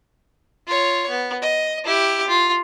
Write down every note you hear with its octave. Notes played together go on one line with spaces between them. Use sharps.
F4 C#5
B3
D#5
E4 G4
F4